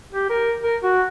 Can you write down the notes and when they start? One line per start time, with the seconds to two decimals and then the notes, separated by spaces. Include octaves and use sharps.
0.13 G4
0.30 A#4
0.63 A#4
0.83 F#4